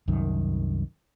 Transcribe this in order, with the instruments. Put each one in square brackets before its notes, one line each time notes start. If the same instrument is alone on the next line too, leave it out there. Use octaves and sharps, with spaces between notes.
[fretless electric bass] C2 F#2 D#3